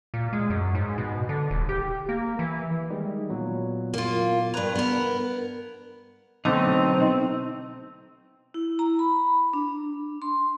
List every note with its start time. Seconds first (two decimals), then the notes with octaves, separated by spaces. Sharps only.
0.14 A#2
0.33 G#3
0.50 F#2
0.75 G#2
0.98 B2
1.29 D3
1.51 D#1
1.69 G4
2.09 A#3
2.39 E3
2.90 D#3 G3 G#3
3.29 A#2 F#3 B3
3.94 A#3 F4
4.54 G2 D4 B4 A#5 G#6
4.75 B3 A#4
6.45 B1 D3 A3 C4 D#4
8.54 E4
8.79 A#5
8.99 B5
9.53 D4
10.22 C6